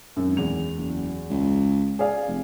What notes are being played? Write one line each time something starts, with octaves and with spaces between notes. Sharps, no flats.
G#1 F#2
E2 F7
F#1
C#2
G#4 D5 F5
F1